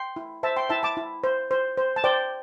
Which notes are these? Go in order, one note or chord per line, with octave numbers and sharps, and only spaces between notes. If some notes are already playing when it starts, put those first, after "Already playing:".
Already playing: G5 C6
E4
C5 E5 A5
G5 C6
E4 E5 A5
A5 D6
E4
C5
C5
C5
A5
C5 D5 G5